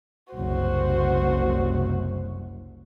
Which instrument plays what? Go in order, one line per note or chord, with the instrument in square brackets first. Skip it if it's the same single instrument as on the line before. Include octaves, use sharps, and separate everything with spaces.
[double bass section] F#1 C2 [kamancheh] F#4 C5